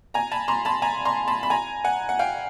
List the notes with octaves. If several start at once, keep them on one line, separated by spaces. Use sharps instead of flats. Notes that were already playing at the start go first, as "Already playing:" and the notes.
G#5 A#5
A5 B5
A#5 C6
A5 B5
G#5 A#5
A#5 C6
A5 B5
B5
G#5 A#5
F#5 G#5
F#5
F5 G5